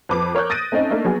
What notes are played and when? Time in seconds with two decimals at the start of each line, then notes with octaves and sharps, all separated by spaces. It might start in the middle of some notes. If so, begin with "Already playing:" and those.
0.09 F2 B4 D6
0.35 A#4 C#5 D6 F#6 G6
0.50 D#6 A6 A#6 D7 D#7
0.72 A3 C4 C#4 D#4 D#5
0.90 A3 A#3 D4 D#4
1.05 F#3 B3 G#4